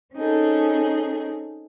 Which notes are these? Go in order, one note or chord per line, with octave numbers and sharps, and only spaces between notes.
C4 C#4 D#4 G#4 A4